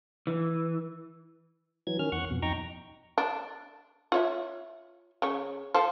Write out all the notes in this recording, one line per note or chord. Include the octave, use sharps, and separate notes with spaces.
E3
E3 F#3 G#6
D#3 C#4 F6
E2 F#5 C#6
F2 B2
F2 D#4 G5 A#5 C#6
D4
F4 C#5 E5
C#3 C#5
F3 A4 C5